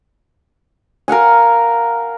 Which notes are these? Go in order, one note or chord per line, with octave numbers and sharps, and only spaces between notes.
A#4 F5 F#5 G#5